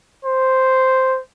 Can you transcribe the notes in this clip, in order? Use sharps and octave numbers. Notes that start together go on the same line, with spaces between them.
C5